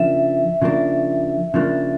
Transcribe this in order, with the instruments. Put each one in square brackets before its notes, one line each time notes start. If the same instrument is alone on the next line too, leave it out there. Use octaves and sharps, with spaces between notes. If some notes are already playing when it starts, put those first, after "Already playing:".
Already playing: [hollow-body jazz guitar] C#3 F3 A#3 D4 [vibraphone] E5
[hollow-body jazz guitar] C#3 F3 A#3 D4
C#3 F3 A#3 D4